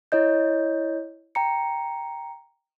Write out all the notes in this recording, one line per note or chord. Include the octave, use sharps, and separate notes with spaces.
E4 C#5 D#5 G6
G5 A#5 C#7